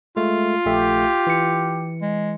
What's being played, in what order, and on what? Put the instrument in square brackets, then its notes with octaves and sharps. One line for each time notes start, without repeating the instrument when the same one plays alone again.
[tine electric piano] G#3 A3 [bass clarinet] F4
[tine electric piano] A#1 A3 E5 [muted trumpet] G4
[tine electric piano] E3 C#7
[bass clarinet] G#3